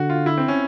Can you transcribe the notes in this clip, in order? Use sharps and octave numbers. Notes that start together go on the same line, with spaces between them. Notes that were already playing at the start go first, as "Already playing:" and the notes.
Already playing: D3 F#4
F4
E4
C4
C#4